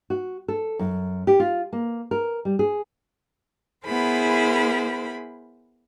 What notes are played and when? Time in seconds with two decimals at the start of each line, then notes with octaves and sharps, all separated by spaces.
0.10 F#4
0.48 A4
0.79 F#2
1.27 G4
1.40 F4
1.73 A#3
2.11 A#4
2.45 G3
2.59 G#4
3.85 B3 E4 G#4 A#4 C5 B5